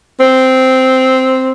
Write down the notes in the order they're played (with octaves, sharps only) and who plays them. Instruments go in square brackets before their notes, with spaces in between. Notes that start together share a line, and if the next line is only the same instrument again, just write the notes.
[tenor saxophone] C4